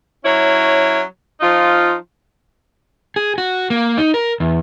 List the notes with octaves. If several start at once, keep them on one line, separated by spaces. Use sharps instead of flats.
F#3 C#4 E4 C#5
F3 D#4 F4
G#4
F#4
A#3
D#4
A#4
E2